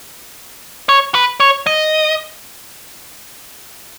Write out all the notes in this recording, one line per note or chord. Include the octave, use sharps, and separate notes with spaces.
C#5
B4
C#5
D#5